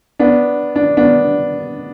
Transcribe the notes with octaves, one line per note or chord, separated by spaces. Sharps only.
B3 D4
D4
B3 D4